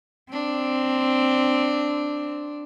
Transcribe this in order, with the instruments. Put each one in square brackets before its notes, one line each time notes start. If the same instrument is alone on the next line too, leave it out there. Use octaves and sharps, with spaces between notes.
[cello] C4 [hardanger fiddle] D4